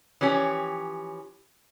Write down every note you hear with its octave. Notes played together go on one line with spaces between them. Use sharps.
E3 F3 C#4 G4